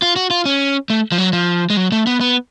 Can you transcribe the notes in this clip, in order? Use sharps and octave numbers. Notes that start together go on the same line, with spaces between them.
F4
F#4
F4
C#4
A3
F3
F#3
F3
G#3
F#3
A3
B3
B3